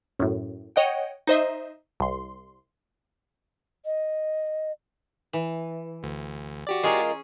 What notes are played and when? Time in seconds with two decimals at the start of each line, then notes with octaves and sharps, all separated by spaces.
0.19 F#2 A2
0.76 C#5 D#5 F#5 G5
1.27 D#4 C5 D#5 E5
2.00 C2 C6
3.85 D#5
5.33 E3
6.03 D2
6.67 F#4 G4 D5
6.83 G#3 C#4 F4 G#4 A#4